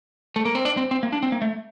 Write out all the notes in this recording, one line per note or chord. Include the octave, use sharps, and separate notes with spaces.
A3
A#3
C4
D4
C4
C4
A#3
D4
C4
A#3
A3